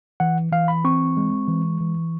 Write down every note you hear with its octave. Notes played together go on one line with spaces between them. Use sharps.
E3 F#5
E3 F5
B5
C4 C#6
G#3
E3
E3